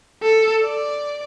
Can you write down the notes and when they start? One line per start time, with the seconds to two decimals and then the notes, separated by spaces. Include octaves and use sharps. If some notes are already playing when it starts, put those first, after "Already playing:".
0.23 A4
0.64 D5